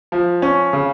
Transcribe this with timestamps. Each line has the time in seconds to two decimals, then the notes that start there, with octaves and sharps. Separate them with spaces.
0.12 F3
0.42 C#4
0.73 C#3